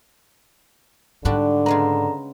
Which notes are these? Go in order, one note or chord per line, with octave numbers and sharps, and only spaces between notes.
G#2 D3 G3 D4 F#4
C#3 G#3 B3 A#5